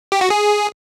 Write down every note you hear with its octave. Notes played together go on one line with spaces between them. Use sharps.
G4
F#4
G#4